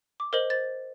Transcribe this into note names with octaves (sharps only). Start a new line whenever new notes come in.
D6
A#4 C5 D#5 F#7
C5 A6